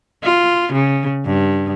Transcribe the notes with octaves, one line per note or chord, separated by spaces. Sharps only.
F4
C#3
G2